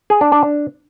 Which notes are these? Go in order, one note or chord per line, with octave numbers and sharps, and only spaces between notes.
G#4
D4
D4
D4